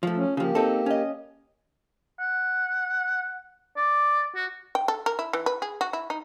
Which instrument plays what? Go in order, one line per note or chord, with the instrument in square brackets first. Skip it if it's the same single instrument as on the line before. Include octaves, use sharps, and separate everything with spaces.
[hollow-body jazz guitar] F3 A3
[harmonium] C#4
[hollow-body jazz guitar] C#3 F3 [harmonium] A#3 G4
[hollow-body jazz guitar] C4 D#4 A4
C#4 D#5
[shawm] F#5
D5
F#4
[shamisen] G5
A4
A#4
E4
E3
B4
G#4
F#4
E4
D#4